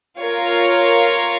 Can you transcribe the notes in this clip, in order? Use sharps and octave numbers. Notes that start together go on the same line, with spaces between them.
F4 A#4 C#5 F5